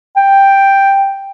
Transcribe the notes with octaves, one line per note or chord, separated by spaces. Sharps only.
G5